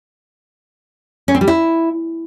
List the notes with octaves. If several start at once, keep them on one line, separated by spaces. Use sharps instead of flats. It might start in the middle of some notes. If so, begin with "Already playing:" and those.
C#4
C4
G3
E4